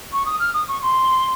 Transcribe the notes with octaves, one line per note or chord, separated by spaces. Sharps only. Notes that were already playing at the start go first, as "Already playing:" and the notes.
C#6
D#6
F6
D#6
C#6
C6